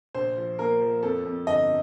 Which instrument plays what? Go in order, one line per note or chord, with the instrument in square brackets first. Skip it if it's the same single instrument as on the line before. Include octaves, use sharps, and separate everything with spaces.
[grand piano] A#1 C5
F3
A#3 A#4
F3
F2 A4
F2
G1 D#5